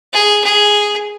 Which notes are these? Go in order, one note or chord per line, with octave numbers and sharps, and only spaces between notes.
G#4
G#4